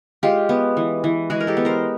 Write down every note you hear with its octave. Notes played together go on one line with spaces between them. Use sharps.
G#3 F4 G4
B3
E3
E3
G#3 F#4 G#4
A#4
G4 A4
B3
A#4 C5